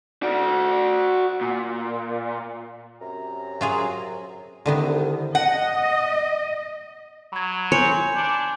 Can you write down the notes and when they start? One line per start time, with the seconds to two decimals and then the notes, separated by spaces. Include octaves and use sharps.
0.23 F#4 D5
1.41 A#2
3.01 F#2 C3 A#5
3.61 F#3 F4 G#4
4.66 C2 D3 D#3 B3
5.35 D#5 F#5
7.33 F#3 B5 G#6
7.72 C#5 G#5 C6 G6
8.16 D4 G6